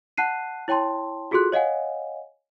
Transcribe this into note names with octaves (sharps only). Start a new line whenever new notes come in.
F#5 A5 F#6 C7 D#7
E4 C#5 G5 A5 C6
F4 F#4 G#4 A4 C6 F#6
C#5 D#5 F5 F#5 G#5